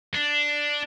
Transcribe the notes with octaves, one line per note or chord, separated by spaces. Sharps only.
D4